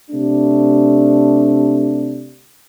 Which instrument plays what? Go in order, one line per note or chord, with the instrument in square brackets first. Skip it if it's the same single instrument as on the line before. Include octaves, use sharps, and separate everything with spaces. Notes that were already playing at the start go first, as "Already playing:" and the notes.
[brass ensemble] C3 A3 D4